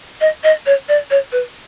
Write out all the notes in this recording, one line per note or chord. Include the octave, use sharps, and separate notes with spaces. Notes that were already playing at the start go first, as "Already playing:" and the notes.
D#5
D#5
C#5
D5
C#5
B4